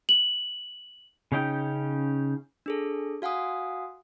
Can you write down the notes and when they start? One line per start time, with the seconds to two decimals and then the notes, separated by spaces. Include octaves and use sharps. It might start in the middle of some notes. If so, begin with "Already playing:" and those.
0.09 F#7
1.32 C#3 C#4 D#4 G5
2.66 D4 G#4 A4
3.22 F#4 F5 F#5 G#5 D#6